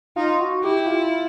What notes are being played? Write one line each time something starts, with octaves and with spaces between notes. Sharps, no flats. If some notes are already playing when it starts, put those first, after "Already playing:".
D#4 F4
F#4
E4 G4
F4